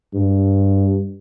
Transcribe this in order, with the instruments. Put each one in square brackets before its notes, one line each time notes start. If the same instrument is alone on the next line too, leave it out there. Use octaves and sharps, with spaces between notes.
[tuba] G2